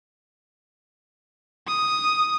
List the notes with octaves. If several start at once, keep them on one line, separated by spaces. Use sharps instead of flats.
D#6